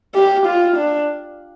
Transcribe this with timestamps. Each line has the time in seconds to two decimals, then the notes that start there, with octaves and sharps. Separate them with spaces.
0.15 G4
0.46 F4
0.77 D4